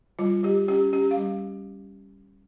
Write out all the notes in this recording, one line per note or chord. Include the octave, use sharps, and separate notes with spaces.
G3 F4
G3 G4
C#4 G4
C#4 G4
F5
G3